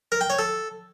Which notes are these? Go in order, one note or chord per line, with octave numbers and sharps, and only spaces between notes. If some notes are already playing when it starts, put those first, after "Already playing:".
A#4
G5
C#5
A4